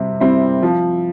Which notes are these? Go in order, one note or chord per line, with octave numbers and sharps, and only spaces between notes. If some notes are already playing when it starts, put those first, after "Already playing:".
Already playing: C3 G3 C4
G3 C4 E4
F3